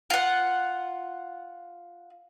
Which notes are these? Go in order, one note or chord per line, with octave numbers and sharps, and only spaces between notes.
F4 F#5